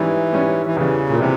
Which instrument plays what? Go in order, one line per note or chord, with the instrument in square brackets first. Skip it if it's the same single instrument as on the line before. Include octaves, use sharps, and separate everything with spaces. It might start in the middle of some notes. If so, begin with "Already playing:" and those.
Already playing: [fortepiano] G#2 G3 C#4 [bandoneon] E3
[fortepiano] G#2 G3 C#4
[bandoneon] E3
[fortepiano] E2 E3 G3 [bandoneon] C#3
[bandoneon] A#2
[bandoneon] C3 [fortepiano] E3 G3